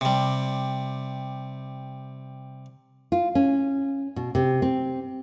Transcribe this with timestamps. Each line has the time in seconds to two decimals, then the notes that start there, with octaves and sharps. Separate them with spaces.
0.01 C3 G3
3.12 F4
3.35 C#4
4.16 B2
4.35 C3
4.62 C4